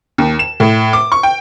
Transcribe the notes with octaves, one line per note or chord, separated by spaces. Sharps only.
D#2
E7
A2
D6
C#6
G5